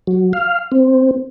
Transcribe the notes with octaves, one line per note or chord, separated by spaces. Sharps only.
F#3
F5
C4